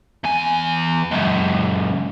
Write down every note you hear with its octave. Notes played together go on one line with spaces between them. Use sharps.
E2 G#5
C#2 F#2